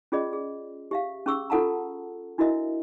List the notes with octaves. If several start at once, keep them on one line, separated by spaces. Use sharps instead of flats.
C#4 F4 G#4 D5 D#5
G#4
G4 E5 F5
C#4 G#4 C#6 E6
F4 A4 F#5 A5 A#5
D4 E4 F#4 A#4 D#5 E5